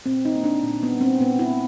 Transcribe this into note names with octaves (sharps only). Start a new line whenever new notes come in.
A#2 C4
D#4
A#3
D4
A#2
B3
G3
C4
A#2 B3
E4
A#3